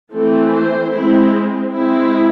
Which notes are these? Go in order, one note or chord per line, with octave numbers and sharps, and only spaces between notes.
E3 A3 C4 A4
C5
G#3 C4 E4
G#3 C4 E4